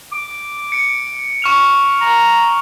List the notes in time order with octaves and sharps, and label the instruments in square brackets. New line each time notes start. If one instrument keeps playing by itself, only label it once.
[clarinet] D6
[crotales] C#7 D7
C#6 F6 F7
[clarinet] A#5